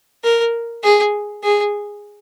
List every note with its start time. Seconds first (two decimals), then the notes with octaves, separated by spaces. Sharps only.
0.24 A#4
0.83 G#4
1.43 G#4